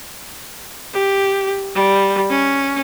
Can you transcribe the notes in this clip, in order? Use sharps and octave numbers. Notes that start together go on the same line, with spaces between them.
G4
G3
C#4